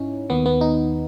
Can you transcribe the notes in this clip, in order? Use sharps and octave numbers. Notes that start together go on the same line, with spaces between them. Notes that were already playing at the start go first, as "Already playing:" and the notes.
Already playing: G#2 C#4 D#4 E4
D#2 D#3 B3
B3
D#4